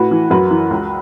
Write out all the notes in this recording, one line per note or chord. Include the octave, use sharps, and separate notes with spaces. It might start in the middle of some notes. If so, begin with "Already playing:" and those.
Already playing: A2 F#4 B4
E3
F#2 F#4 B4
E3
C#2